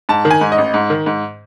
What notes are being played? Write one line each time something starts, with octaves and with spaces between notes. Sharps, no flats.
G#2 A5
D#3
G#5
G#2
D#5
A1
G#2
D#3
G#2